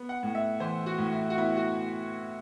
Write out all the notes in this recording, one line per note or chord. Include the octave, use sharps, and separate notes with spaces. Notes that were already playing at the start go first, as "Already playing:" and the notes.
Already playing: B3
F#5
A2
E5
E3 C5
F#4
A2
E4
F#4
B3 E4
F#4